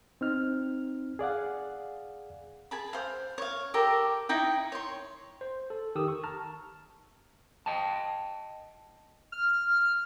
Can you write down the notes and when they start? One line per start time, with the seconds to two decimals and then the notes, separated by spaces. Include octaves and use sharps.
0.21 C4 D#4 F6
1.19 G#4 D5 F5 F#5
2.71 G#4 A5 B5
2.93 C5 F5
3.38 C#5 F5
3.74 G4 A4 A#4
4.29 D#4 E4 G5
4.72 C#5 C6
5.41 C5
5.70 A4
5.95 D#3 G4 D#6 E6
6.08 C#6
6.24 A5 A#5 F6
7.66 D#5 G5 A5
9.32 F6